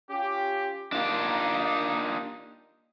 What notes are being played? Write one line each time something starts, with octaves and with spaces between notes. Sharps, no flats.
C#4 F4 G4
A#3 D4 D#4 F4 G4